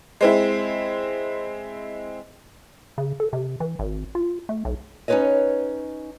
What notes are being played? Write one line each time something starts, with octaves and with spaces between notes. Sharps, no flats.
G#3 C4 E4
C#3
A4
C3
E3
G#1
F4
A3
B1
C#4 D#4 F4 B4 C#5 D#5